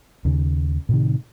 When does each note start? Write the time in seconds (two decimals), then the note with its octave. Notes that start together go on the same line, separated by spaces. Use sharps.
0.25 D#2 C#3
0.89 A2 C3 D#3